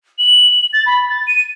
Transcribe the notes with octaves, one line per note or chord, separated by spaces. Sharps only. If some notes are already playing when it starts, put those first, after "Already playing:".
F#7
A6
B5
A6
D#7